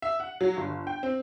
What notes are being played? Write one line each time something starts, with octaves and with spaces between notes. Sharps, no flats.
E5
F#5
F#3
G1
G5
C4